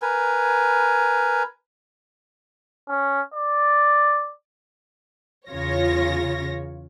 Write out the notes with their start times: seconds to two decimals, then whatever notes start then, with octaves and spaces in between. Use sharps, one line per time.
0.02 A#4 B4 G#5
2.89 C#4
3.34 D5
5.50 E2 C#3 F4 C#5 A#6